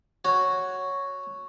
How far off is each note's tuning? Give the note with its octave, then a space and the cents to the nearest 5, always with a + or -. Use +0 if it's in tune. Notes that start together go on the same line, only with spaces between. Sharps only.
F#4 +0 C#5 +0